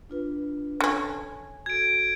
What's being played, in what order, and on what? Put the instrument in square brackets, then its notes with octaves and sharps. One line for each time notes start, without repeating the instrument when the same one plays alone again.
[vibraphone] D4 F4 B4
[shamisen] D3 C#4 [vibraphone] G#5
[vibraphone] F#4 A4 [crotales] G#6 D7